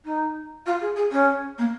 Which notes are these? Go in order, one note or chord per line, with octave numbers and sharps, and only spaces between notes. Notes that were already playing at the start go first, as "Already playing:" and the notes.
D#4
F4
G#4
G#4
C#4
A#3